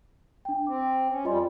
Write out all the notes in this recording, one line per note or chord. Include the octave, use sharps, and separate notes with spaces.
D4 G5
C4 D6
C#4
F2 G3 F4 D#5 C6